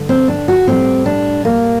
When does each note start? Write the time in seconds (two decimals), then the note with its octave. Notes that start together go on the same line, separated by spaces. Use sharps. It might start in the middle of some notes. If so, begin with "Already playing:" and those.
Already playing: G2 D3
0.09 C4
0.28 D4
0.48 F#4
0.67 A2 G3 C4
1.06 D4
1.45 A#3